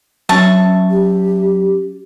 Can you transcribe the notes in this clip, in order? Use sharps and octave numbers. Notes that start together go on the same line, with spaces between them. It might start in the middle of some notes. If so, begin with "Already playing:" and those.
F#3 C#4 E5 A5 C#6
G4